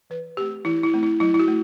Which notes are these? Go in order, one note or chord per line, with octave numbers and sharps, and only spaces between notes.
E3 B4
A3 C4 G4
E3 E4
E4
A3 C4
E4
F#3 E4
E4
F#4
A3